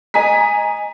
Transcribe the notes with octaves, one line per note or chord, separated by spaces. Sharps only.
D#5 G#5 A#5 B6